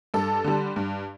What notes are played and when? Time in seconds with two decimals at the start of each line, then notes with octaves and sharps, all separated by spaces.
0.14 G2 A4
0.44 D3 G3
0.76 G2